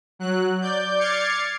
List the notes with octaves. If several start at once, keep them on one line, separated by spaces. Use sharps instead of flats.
F#3 F#6
D5 G6
D6 F6 G#6 A6 C7 C#7